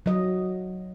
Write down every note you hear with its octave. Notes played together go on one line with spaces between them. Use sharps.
F#3 D#5